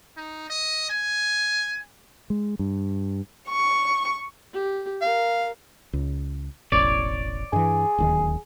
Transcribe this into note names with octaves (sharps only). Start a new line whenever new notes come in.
D#4
D#5
G#5
G#3
G2
C#6
G4
A#4 F5
C#2
E1 A1 C#5 D5
G2 E3 G#4
D1 D#2 D#3